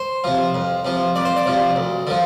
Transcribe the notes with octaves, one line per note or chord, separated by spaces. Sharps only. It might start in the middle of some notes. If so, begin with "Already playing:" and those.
Already playing: C5
C3 F3
F2
C3 F3
F2 D5
C5
D5
C3 F3
D2
D3 F3